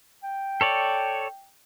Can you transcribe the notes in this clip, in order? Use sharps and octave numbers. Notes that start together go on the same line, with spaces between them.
G5
A4 C#5 D5